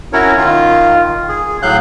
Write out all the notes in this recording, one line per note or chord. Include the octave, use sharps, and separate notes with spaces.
C#4 E4 F#4 A#4 C#5
D#3 F4
G#4
A2 F#3 F5 F#6 G6